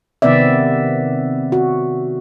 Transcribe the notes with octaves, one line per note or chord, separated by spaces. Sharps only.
C3 D#3 B3 C4 D5 E5
F#4